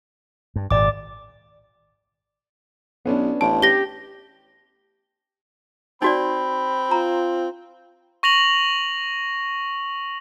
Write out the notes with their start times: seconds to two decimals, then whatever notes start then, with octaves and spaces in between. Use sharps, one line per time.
0.56 G2
0.71 G#1 A#2 D5 D6
3.05 B1 B3 C#4 D4
3.41 A1 A5
3.62 G4 A#6 G7
6.02 C4 D#4 F#4 D5 B5
6.91 F4 A#5
8.23 C#6 A#6 F7 F#7